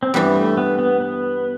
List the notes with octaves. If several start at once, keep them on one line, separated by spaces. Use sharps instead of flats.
C4
G2 E3 G3 B3
A3
B3
B3
B3